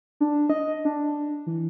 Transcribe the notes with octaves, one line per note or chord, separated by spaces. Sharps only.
D4
D#5
D4
E3